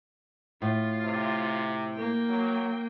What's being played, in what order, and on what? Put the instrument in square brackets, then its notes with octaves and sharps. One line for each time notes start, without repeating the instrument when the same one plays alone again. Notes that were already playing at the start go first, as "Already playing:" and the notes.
[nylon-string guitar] A2 [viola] F4
[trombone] C3
[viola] A#3 G5
[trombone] F#3